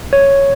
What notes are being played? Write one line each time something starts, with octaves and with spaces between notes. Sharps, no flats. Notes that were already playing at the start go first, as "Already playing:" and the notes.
C#5